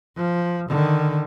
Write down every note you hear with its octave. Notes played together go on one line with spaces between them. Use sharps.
F3
D3 D#3